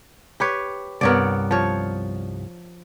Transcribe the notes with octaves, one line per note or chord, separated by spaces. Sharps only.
G4 B4 C#5
C2 G2 B3 A#4 C#5 D5
F3 C#5